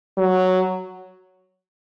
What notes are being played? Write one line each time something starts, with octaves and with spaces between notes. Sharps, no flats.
F#3